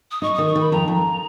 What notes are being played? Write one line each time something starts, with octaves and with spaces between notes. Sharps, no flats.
D#6
D#4 C#6
D#3 D#6
C#6
D#3 B5
F2 A#5
F2